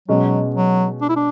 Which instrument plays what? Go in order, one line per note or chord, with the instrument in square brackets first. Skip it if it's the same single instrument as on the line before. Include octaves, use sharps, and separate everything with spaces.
[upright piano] B2 G#3 C#4 [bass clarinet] F#3
[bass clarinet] F#3
D4
E4
D4